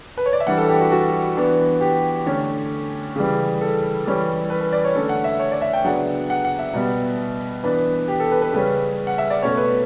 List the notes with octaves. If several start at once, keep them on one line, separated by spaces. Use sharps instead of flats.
B4
C#5
D5
E5
E3 G3 D4 F#5
A4
G4
F#4
F#4
E3 B3 D4
G4
D3 A3 C#4
C#3 E3 G3
A4
E3 G3 C#4
B4
B4
D5
C#5
D3 A3 C#4 A4
F#5
E5
C#5
D5
E5
G5
C#3 F#3 B3 D4 F#5
F#5
F#5
E5
B2 G3 B3
E3 B3 D4 B4
G4
A4
B4
B4
C#3 G3 C#4 B4
F#5
E5
D5
B2 A3 C#4 C#5
B4